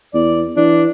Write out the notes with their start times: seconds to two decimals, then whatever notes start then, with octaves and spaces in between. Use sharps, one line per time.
0.14 E2 D5
0.57 E3 D4